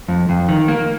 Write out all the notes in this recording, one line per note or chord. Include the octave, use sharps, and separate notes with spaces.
F2
F2
D#3
A#3